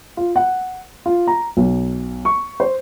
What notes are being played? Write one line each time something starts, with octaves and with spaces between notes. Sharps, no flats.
F4
F#5
F4
A#5
B1
C#6
C5